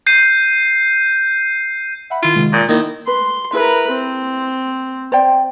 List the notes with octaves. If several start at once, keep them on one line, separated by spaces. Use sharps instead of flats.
G6 C7 D#7
E5 F#5 B5
D#3 E4 F4
C3 D#3 G#3
A#2 D#6
D#3 A#3 E4
B4 C6
E4 G#4 A#4 B4 E5
C4
C5 D5 G5